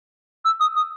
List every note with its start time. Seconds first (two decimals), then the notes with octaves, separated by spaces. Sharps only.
0.45 E6
0.60 D#6
0.76 D#6